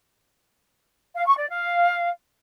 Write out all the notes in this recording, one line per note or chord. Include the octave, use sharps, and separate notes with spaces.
F5
C#6
D5
F5